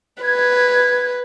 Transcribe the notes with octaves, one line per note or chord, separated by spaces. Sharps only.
B4 G#6